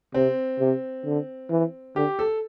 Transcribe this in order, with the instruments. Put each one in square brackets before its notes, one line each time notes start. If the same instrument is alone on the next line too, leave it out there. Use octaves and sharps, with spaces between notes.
[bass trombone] C3 [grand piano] C4
[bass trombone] C3
D3
E3
[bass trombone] D3 [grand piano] G4
[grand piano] A4